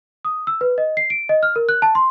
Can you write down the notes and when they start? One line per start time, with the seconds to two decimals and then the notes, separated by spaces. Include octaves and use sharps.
0.25 D#6
0.47 E6
0.61 B4
0.78 D#5
0.97 C7
1.10 D7
1.29 D#5
1.43 F6
1.56 A#4
1.69 F#6
1.82 A5
1.95 C6